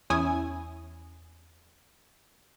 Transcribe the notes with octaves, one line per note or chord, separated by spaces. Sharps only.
E2 C#4 E4 G#5 D#6